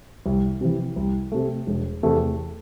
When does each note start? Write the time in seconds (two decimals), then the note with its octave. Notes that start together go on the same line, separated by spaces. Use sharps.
0.26 C2
0.61 C3 E3
0.96 C2
1.32 C3 A3
1.67 E1
2.03 E2 C3 A3